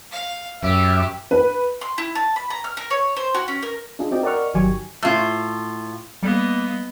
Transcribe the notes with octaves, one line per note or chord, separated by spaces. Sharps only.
F5
F#2 G4 E5
B4
C6
E4
A5
B5
A#5
F6
A#4
C#5
C5
F#4
C#4
A#4
D4 D#4 F4 G#4
C4 F#4 D5 D#5 G5
A#4 D5 D#5 F#5 C#6 F6
G1 D#3 F#3 G4 G#5 C#6
A2 F4
G3 A#3 B3 D#5